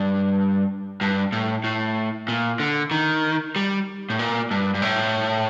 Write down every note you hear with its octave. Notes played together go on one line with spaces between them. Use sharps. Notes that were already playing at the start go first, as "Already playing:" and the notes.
Already playing: G2
G2
A2
A2
A#2
D3
D#3
G3
A2
A#2
G2
G2
A2